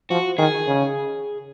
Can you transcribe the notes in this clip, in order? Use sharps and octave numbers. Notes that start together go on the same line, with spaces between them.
F3 F#4
D#3 G#4
C#3